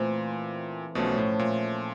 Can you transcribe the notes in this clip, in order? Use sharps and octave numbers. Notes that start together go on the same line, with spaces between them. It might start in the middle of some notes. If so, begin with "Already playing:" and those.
Already playing: A#2 E3 A3 C4 F4
B1 B2 F3 A3 C#4 F4
A2
A#2